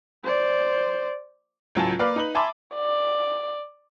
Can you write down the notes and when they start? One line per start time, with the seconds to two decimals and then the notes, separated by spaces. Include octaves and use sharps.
0.24 C5 D5
1.75 C#2 A2 F#3 F4 G#5 A5
1.99 A#3 B4 D5 F5
2.16 D#4 B4 F#7
2.35 E5 G#5 A5 B5 C6 D6
2.75 D5